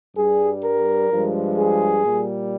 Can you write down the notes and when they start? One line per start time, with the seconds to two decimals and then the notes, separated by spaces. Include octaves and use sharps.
0.16 G2 G3 G#4
0.63 A#4
1.11 G2 F3 G#3
1.57 G#4
2.05 A#2 G3